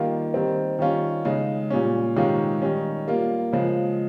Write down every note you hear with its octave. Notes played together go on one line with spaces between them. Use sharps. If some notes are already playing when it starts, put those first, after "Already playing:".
Already playing: D#3 G3 A#3 F4
D#3 G3 C4
D#3 G3 C#4 F4
C#3 G#3 D#4
A#2 G3 C#4
C3 D#3 G#3 C#4 F4
D#3 G3 C#4
G3 A#3 F4
C#3 F3 G#3